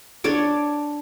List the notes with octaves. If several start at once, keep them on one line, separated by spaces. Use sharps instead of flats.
D4 C#5 D5 D6